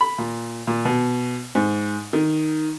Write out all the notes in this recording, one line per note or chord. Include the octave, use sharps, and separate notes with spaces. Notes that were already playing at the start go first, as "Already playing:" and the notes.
B5
A#2
A#2
B2
G#2
D#3